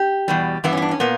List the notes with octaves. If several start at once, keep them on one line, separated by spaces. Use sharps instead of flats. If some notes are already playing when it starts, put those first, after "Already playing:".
Already playing: G4
E2 B2 G3
G2 E3 B3 E4
C#4
E4
D4
C#4
A#2 A#3 B3